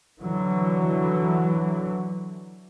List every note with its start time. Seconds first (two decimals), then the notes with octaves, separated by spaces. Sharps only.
0.21 D3 E3 F#3